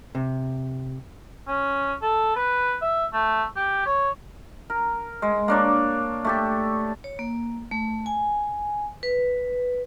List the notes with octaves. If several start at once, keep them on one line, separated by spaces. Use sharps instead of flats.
C3
C#4
A4
B4
E5
A3
G4
C#5
A#4
G#3
A#3 D4 C#5
A3 G4 A4
C#5
A#3
A3
G#5
B4